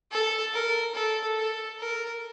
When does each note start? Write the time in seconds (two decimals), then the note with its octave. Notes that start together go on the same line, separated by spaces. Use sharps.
0.11 A4
0.54 A#4
0.95 A4
1.37 A4
1.79 A#4